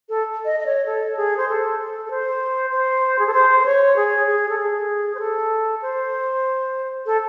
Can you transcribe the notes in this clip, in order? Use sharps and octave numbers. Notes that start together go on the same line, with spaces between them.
A4
D#5
D#5
C#5
A4
G#4
C5
A4
A4
A4
C5
C5
G#4
A4
C5
C5
C#5
G#4
G#4
A4
G#4
C5
A4
C5
A4